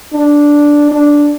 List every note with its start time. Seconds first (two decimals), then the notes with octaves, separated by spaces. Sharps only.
0.13 D4
0.91 D4